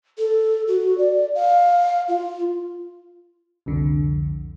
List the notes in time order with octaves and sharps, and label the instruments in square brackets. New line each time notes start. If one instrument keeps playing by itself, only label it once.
[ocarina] A4
F#4
D5
F5
F4
[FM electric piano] C2 F2 D3